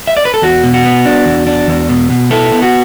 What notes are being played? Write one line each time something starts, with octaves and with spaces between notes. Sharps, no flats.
E5
D5
B4
A4
E2 F#4
B2
F#4
B3
D4
E2
D4
E2
B2
B2
B3 E4 A4
B3
F#4